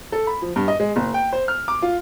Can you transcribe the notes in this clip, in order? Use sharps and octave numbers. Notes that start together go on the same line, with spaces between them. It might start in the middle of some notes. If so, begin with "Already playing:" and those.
A4
B5
F3
G2
D#5
G#3
F#1
G5
C5
F6
D6
F4